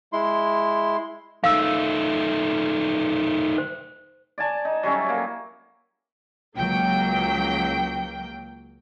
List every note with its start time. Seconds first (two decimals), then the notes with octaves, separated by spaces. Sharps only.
0.13 G#3 E4 C6
1.44 D#3 A3 F5 E6
3.58 C5
4.38 D5 G#5 A5
4.65 D#4
4.83 F#3 G3 C#4 E4
5.09 A#3
6.56 C#2 F#3 A#3 G5